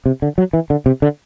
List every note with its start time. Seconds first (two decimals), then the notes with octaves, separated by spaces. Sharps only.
0.06 C3
0.22 D3
0.38 F#3
0.53 E3
0.70 D3
0.86 C3
1.02 D3